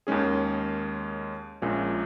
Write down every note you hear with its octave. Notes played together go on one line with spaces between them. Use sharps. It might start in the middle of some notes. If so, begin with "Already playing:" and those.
D#2 D#3 G#3 C#4 G#4
A#1 A#2 G#3 C#4